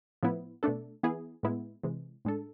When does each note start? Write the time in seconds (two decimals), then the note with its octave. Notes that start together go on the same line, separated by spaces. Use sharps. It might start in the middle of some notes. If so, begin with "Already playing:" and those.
0.23 A2 F3 B3 E4
0.63 B2 A3 D4 A4
1.03 E3 B3 E4 G#4
1.43 A2 G#3 B3 E4
1.83 C3 E3 G#3
2.25 A2 G#3 D4 A4